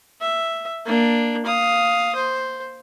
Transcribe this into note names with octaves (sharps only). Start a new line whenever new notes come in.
E5
A#3 D4
F5 D#6
C5